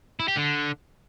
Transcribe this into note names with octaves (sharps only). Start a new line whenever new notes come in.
E4
G4
D3